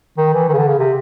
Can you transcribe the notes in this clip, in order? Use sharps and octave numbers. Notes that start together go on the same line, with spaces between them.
D#3
E3
D#3
C#3
D3
C#3
C3